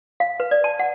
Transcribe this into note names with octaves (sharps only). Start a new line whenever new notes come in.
F5
B4
D5
A5
F#5